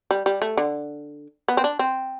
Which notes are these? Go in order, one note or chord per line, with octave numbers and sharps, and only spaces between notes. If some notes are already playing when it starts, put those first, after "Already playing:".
G3
G3
A3
D3
B3
C4
D4
C4